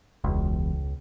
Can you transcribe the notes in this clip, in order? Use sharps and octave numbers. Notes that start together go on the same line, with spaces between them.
E1 C#2